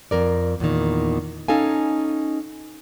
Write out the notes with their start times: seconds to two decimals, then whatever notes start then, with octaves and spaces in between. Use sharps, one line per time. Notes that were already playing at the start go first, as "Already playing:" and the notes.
0.11 F2 A#4 D5
0.60 E2 A#2 D#3
1.48 C#4 D#4 A4 F5 G#5